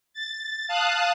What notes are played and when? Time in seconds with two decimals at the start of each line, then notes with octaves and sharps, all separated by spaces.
0.14 A6
0.68 F5 A5 D#6 F#6